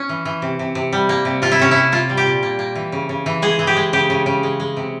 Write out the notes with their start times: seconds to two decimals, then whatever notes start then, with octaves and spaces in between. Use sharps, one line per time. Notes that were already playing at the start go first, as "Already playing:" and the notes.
Already playing: C#4
0.09 E3
0.25 E3
0.42 C3
0.59 C3
0.75 C3
0.93 G3
1.09 A#3
1.25 C3
1.42 C3 F4
1.52 E4
1.59 C3 C#4
1.71 C3 E4
1.92 A#3 F4
2.09 G3
2.17 G4
2.26 A#2
2.43 A#3
2.59 A#3
2.75 E3
2.92 C#3
3.09 C#3
3.26 E3
3.42 G#3 G#4
3.59 E3
3.67 G4
3.76 G#3
3.93 C#3 G4
4.10 C#3
4.26 C#3
4.43 G#3
4.60 G#3
4.77 C3